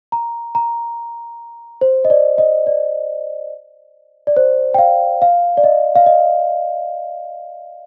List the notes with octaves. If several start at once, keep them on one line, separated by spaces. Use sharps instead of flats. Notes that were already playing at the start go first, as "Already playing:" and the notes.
A#5
A#5
C5
D#5
D5
D#5
D5
D5
C5
G5
F5
F5
D5
D#5
F5
D#5